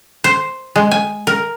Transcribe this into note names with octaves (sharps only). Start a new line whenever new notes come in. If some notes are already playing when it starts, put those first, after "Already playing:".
C5
G#3
G#5
A#4